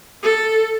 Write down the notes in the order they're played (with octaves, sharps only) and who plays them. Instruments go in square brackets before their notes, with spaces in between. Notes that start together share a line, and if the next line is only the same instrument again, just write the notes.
[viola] A4